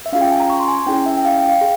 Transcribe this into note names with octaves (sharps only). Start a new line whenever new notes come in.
E5
C#4 F4 G#4 F5
G5
G#5
A#5
C#6
C6
G#5
G#5
C#4 E4 G#4 G5
E5
G5
F5
G5
F5
G#4